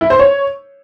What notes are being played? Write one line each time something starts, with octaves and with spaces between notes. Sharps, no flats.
E4
C5
C#5